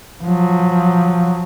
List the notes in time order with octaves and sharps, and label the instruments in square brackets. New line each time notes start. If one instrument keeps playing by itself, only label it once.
[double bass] F3 F#3